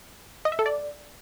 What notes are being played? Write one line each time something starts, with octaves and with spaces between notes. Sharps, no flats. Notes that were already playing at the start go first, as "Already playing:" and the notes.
D#5
E5
A4
D5